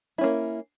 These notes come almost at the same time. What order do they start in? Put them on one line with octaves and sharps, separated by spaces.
E4 C#4 A#3